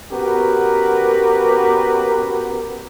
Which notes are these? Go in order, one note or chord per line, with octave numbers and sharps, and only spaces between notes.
B3 C#4 F#4 G4 A#4 B4